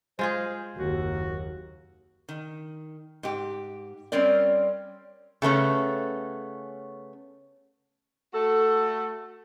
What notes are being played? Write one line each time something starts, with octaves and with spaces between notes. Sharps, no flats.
G#3 F4 G#4 C5
F#1 D#2 F#4
D#3
G#2 G4
G3 C4 C#4 A#4 D5
C#3 A3 B3 C#4
A3 F#4 A4